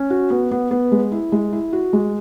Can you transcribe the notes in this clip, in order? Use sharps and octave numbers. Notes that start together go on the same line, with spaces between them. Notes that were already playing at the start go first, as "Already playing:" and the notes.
Already playing: C#4
F#4
B3
B3
B3
G#3
E4
G#3
E4
F#4
G#3